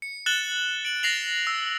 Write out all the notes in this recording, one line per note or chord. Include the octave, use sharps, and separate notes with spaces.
C#7
F#6 A6 E7 F#7 G7
D7 F#7
A6 A#6 C7 F7 F#7
E6